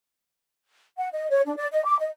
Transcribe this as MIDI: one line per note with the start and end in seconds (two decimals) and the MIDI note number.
0.98 1.09 78
1.13 1.30 75
1.30 1.41 73
1.45 1.55 62
1.57 1.67 74
1.71 1.83 75
1.84 1.97 86
1.99 2.09 75